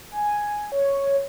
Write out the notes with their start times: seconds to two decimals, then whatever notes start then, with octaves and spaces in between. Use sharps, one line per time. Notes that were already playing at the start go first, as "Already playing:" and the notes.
0.12 G#5
0.72 C#5